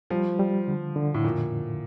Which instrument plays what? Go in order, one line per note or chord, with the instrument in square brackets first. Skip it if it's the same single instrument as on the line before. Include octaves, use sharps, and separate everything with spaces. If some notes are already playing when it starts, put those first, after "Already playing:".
[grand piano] F3 [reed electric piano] G3
[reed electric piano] G3
D3
D3
[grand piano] A2
[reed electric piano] F2 [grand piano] A#2